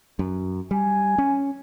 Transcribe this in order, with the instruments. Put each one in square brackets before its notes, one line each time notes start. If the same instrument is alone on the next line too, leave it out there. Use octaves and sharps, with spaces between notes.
[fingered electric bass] F#2
[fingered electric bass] G3 [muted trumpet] G#5
[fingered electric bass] C#4